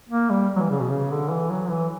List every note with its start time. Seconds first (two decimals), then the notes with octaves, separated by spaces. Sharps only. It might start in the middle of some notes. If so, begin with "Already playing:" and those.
0.09 A#3
0.30 G3
0.56 F#3
0.59 E3
0.70 C#3
0.80 B2
0.90 C#3
1.11 D3
1.31 E3
1.50 F#3
1.70 E3